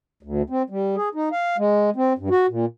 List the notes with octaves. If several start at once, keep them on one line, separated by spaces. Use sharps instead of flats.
D2
C4
G3
G#4
D#4
F5
G#3
C4
G2
F#4
A#2